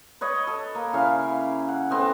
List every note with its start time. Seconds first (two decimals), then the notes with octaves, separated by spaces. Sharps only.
0.21 B4 C#5 D#5 C#6
0.47 A4
0.75 A#3
0.93 C#3 E4 F5
1.68 F#5
1.90 A3 B3 C4